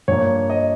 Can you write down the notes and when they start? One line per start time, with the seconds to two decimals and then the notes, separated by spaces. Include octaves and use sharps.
0.08 G2 F3 A#3 C#5
0.50 D#5